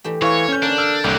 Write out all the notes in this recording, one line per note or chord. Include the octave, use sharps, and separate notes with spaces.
E3 A3 G4
E3 C4 C#5 F5 C#6
C#4 G6
D3 A#3 D4
E6 F6 G6
C2 A2 A3 A#3 G4 F#6